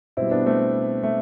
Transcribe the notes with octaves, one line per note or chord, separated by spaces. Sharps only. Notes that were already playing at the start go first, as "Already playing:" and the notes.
B2 G3 C4 E4
B3 D4
A3 C4
A3